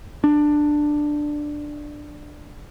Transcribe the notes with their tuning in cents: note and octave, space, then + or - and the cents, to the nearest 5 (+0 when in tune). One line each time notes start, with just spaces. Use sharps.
D4 +10